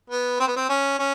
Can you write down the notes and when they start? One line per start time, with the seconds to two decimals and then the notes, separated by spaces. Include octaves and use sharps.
0.10 B3
0.40 C4
0.47 B3
0.56 C4
0.69 C#4
0.99 C#4